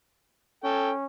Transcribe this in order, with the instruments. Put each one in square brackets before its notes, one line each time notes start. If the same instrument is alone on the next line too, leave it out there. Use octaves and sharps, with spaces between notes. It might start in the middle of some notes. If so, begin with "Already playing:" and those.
[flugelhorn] C#4 [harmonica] A4 G5